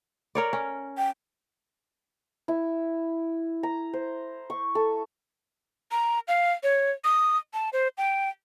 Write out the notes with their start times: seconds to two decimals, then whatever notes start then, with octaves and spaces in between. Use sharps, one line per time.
0.35 A#4 C#5 D5
0.53 C#4
0.98 G5
2.48 E4
3.63 A#5
3.93 C5
4.50 C#6
4.75 A4
5.91 A#5
6.28 F5
6.63 C#5
7.04 D#6
7.54 A5
7.73 C5
7.98 G5